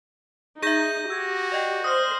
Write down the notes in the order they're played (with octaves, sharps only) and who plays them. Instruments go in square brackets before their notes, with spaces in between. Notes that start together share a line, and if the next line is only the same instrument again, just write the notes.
[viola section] D#4 [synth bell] G#4 E5 [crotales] G6 A#6 D#7
[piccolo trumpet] F#4 [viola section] G4 [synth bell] E6 G#6
[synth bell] D5 D#5 G5
[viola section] C5 [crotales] D#6 F6